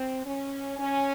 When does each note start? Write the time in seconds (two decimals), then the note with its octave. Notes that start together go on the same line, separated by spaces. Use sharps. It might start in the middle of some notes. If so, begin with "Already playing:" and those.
Already playing: C4
0.26 C#4
0.78 C#4 G#5